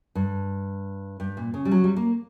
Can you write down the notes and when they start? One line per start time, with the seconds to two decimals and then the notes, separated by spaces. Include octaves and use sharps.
0.15 G2
1.20 G2
1.37 A#2
1.54 C#3
1.65 G3
1.71 F#3
1.84 G3
1.96 A#3